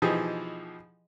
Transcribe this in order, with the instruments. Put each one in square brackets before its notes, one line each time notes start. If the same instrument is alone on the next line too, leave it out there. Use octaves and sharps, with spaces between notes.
[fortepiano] B2 E3 F3 D#4 G4 G#4